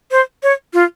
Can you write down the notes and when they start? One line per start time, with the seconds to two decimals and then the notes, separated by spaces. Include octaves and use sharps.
0.11 C5
0.43 C#5
0.73 F4